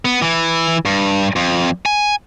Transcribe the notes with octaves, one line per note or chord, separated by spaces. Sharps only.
B3
E3 E4
G2
F2
G#5